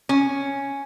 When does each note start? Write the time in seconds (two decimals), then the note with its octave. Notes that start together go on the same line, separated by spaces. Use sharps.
0.09 C#4